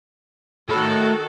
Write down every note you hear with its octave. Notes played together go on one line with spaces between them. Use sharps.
D#3 A3 F#4 A4 B5